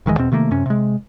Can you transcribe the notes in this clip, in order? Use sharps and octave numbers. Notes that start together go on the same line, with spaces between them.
E1 D#3 E3 G#3
E2 B2 C4
C3 D#3 A3 A#3
F#2 C3 C#4
C3 G#3